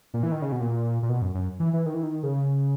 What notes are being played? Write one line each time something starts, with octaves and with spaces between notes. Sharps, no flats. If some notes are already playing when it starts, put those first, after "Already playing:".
A#2
E3
D#3
C#3
B2
A#2
A#2
B2
F#2
F#2
E3
E3
D#3
E3
D#3
C#3